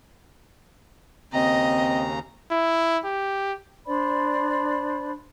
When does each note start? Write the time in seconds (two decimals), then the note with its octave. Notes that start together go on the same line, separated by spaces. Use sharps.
1.33 D#2 C#3 C4 D#5 A#5
2.51 E4
3.05 G4
3.85 D4 C5 D5 B5